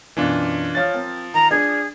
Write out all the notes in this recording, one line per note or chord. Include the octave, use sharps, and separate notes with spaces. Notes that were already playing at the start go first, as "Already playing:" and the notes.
F#2 B2 E3 D4 F4
F3 C#5 F5 F6 A6
C4 A#4
D#3 A#5
D4 G#4